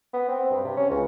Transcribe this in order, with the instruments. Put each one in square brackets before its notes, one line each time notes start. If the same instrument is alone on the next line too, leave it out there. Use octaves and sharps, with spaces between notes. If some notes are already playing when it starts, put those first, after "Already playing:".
[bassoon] B3
C4
G2
C3
C#4
C#2